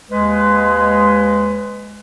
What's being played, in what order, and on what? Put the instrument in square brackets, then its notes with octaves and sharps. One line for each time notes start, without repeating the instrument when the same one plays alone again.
[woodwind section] D#2 G#3 B4